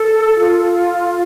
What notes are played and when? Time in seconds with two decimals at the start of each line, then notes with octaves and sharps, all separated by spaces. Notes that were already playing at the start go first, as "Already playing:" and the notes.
Already playing: A4
0.39 F4